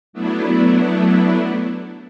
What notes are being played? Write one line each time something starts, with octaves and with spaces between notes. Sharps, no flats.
F#3 A3 B3 D4 E4